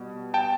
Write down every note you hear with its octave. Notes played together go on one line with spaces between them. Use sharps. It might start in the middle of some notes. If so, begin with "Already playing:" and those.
Already playing: B2 G3
G5 A5